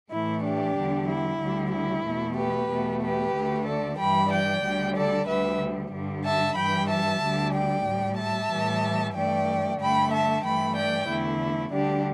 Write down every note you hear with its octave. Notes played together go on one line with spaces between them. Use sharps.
A2 E3 A3 E4
D4 G4
E2 D3 G3
E4
D2 D3 G3
E4
E2 B2 A3
G4 B4
E2 B2 A3
G4 B4
D2 D3 A3
A4 D5
G2 E3 G3 G5 B5
D5 G5
D2 D3 G3
A4 D5
D2 D3 G3 B4 E5
G2 D3 G3
E5 A5
G2 E3 G3 G5 B5
E5 A5
D2 D3 G3
D5 G5
A2 G3
E5 A5
A2 E3 G3
G2 E3 A3 D5 G5
G2 D3 A3 G5 B5
E5 A5
G2 E3 A3 G5 B5
D5 G5
E2 D3 A3 E4
D2 D3 G3 D4 G4